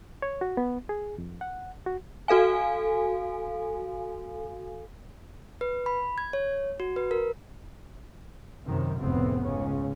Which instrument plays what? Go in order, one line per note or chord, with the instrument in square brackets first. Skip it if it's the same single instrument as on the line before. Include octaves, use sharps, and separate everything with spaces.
[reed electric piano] C#5
F#4
B3
G#4
F2
F#5
F#4
[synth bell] F#4 A4 F5 G#5
[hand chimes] B4
B5
G#6
C#5
F#4
B4
A#4
[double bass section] F#2 C3 D#3
F1 D2 A2 C#3 B3 C4
C#2 G#2 C#3 C#4